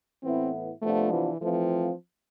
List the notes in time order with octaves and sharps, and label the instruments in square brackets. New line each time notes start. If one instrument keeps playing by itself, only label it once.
[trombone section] A2 E3 B3 E4 [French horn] C4
[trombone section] C3 F3 B3 D4 F4 [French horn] A3
[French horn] E3
[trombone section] E3 A3 C4 F4 [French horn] F3